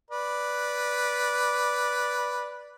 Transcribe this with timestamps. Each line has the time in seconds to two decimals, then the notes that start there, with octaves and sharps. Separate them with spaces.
0.11 B4 D5